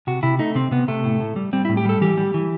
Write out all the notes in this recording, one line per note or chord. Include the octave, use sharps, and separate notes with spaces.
C3 F#4
C3 E4
A3 D#4
C3 C4
C3 B3
C3 A3
A2
A2
G3
G3 C4
E4
A2
G4
G3 A4
E3 G4
G3
E3